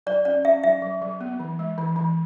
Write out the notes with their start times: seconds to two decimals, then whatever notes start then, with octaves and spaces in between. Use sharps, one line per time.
0.07 F#3 D5
0.25 C#4 D5
0.45 C#4 E5
0.64 F#3 E5
0.82 F#3
1.02 F#3
1.21 B3
1.40 E3
1.59 G#3
1.78 E3
1.96 E3